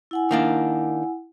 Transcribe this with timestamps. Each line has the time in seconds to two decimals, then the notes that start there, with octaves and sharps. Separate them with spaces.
0.11 E4 F#5 G#5
0.31 D#3 A#3 D4